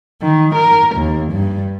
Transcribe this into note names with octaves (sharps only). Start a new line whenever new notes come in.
D#3
A#4
D#2
G2